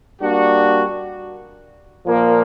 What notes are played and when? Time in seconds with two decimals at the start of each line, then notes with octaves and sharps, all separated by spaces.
0.21 G3 A#3 D4 F#4
2.05 A#2 F3 A#3